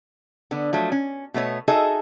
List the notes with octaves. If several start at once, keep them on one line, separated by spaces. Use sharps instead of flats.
D3 B3
F3 F#3 A3
C#4
B2 A3 B3 C#5
D#4 F#4 G#4 A4 D#5 E5